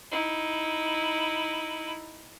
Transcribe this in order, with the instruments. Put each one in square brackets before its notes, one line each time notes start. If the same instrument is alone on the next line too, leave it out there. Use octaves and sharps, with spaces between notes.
[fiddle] D#4 E4